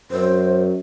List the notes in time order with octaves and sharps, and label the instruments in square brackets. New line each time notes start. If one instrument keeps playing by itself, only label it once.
[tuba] F#2 [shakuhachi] C5